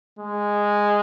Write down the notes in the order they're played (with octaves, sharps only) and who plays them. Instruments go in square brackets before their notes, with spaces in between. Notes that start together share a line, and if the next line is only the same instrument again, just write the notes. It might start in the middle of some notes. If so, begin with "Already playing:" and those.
[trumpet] G#3